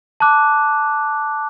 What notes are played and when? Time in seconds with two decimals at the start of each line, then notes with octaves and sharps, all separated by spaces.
0.20 A5 D6 F#6